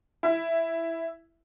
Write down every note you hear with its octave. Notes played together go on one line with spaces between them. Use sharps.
E4